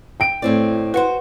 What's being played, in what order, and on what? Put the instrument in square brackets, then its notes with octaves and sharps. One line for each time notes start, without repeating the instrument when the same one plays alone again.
[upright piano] G5 D7
[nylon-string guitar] A2 C4 D5 [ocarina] E4
[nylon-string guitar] F#4 C5 [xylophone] B4 F#5